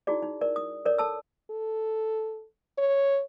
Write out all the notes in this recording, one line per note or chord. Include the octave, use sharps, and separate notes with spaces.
D#4 E4 F#4 G#4 D5
D#4
A#4 D5
D#6
A4 A#4 C#5 D5
A4 A5 E6
A4
C#5